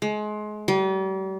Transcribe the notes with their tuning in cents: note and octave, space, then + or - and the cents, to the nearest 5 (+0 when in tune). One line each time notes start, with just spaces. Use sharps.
G#3 +30
G3 -40